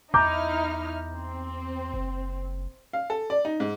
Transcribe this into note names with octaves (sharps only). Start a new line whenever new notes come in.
E2 D#4 E4 A#5 D6 F6 G6
C4
F#1
F5
A4
D5
D#4
G#2